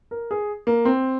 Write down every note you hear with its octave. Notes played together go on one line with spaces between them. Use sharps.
A#4
G#4
A#3
C4